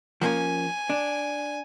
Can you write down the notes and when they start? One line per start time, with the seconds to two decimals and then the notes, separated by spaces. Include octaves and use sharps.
0.22 F3 A#3 C#4 G#5
0.90 D4